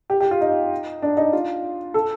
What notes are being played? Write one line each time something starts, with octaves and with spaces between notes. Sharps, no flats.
G4
G4
F4
D#4
D4
D#4
F4
A4